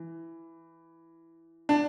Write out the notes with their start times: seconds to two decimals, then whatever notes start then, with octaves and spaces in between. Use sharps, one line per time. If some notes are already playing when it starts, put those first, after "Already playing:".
Already playing: E3
1.69 D4